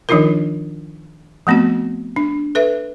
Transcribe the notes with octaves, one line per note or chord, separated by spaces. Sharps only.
D#3 F3 D4 D#4 F4 A#4
F3 A3 B3 C4 F#4
D4
A4 B4 E5